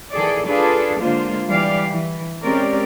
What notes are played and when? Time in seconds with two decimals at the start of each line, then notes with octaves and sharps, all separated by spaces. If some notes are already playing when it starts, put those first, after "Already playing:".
0.14 D#3 E3 G#4 A4 D5
0.47 D4 F4 G#4 A4 B4 D5
1.00 D3 G#3 A#3 F4 C5
1.48 E3 G3 G4 D5 F5
1.89 E3
2.43 G#3 C4 C#4 G4 A#4 D5